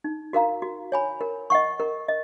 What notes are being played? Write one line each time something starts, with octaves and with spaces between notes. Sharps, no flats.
D#4
F#4 A#4 F5 A#5
F#4
C#5 G#5 B5
A#4
D#5 F#5 C#6
A#4
D#5